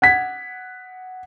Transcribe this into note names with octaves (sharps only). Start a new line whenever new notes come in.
F#5 G#6 B6